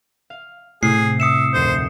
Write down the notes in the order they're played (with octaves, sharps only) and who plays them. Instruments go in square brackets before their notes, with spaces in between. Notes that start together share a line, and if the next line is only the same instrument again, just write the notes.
[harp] F5
[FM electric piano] A2 [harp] C3 [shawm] G#4 [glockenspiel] C7
[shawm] E5 [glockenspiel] D#6 C#7 E7
[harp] F1 D2 A#2 [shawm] C5